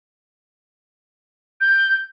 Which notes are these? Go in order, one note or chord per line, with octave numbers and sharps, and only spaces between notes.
G6